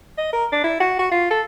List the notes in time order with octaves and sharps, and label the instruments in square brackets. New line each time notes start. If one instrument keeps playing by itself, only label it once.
[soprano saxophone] D#5
A#4
D4
E4
F#4
F#4
F4
A4